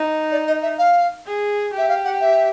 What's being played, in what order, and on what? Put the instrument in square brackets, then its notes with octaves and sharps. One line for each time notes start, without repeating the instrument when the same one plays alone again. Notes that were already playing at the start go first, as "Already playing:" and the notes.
Already playing: [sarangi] D#4
[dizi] D5
D#5
E5
F5
[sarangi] G#4
[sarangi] G4 [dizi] E5
[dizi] F5
F#5
E5